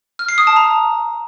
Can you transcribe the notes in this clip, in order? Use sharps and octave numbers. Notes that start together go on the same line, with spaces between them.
F6
C7
D#6
A5
A#5